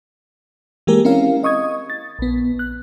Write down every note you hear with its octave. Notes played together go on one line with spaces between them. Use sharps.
E3 G#3 A#3 G4 G#4 A#4
C4 C#4 E4 A#4 F5
D#5 C#6 D#6 G#6
A6
A#1 B3
F#6